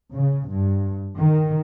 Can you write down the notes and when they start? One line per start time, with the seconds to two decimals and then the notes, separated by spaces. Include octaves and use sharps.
0.13 C#3
0.50 G2
1.17 D#3